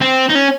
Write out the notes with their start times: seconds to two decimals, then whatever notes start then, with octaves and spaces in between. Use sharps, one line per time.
0.01 C4
0.29 D#4
0.35 C#4